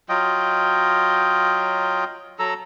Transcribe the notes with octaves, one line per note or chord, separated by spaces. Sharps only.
F#3 F4 D#5 G5
F#3 A4 A#5 E6